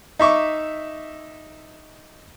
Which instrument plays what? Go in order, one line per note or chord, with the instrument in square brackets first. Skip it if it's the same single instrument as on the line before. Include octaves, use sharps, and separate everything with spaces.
[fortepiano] D#4 E5 C#6 D6